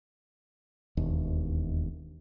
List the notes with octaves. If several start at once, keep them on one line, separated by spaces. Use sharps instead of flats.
E1 D#2